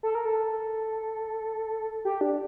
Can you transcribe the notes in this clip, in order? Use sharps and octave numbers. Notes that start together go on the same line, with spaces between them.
A4
A#4
A4
G4
D4